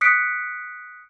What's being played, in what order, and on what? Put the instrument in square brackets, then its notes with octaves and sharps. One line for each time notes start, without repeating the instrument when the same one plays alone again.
[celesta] D#6 F#6 B6 C#7 D7